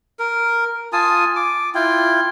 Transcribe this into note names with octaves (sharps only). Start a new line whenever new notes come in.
A#4
F4 G#5 A5 D#6
D6
E4 F4 G5